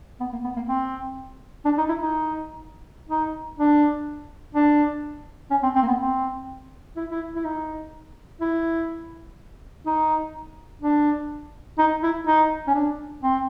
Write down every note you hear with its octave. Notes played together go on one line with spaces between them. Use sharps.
B3
A#3
B3
A#3
C4
D4
D#4
E4
D#4
D#4
D4
D4
C#4
C4
C4
A#3
B3
C4
E4
E4
E4
D#4
E4
D#4
D4
D#4
E4
D#4
C#4
D4
C4